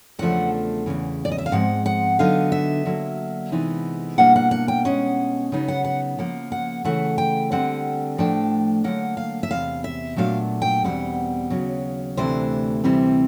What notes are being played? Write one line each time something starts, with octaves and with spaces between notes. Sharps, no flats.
E2 C#3 F3 A3 D4 F#5
E2 C#3 E3
D5
D#5
E5
F5
G#2 F3 G#3 C4 F#5
F#5
D3 F#3 B3 D#4 F5
E5
D3 F#3 A#3
C3 E3 G#3 B3 D#4
B2 G3 A#3 D4 F#5
F#5
F#5
G5
B2 G#3 C#4 F#5
C#3 F#3 B3 D#4
F#5
F#5
C#3 F3 A#3 F#5
F#5
C#3 E3 A3 F#5
G5
D3 G3 C4 F#5
A2 F3 A3 D4 G5
D3 F#3 A#3 F#5
F5
E5
E2 C3 F5
E5
A#2 F#3 A3 D4 F5
G5
E2 B2 G3 C4 F#5
D#2 C#3 F#3
D2 C3 E3 A3 D4 C5
D2 C3 E3 G3 C4